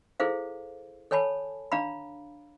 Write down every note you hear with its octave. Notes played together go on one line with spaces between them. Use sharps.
E4 G#4 A4 C5 F5
A4 C#5 G#5 A5 B5
D4 F5 A#5 B5